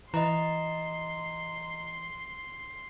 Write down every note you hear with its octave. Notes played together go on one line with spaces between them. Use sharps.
E3 D#5 A#5 C6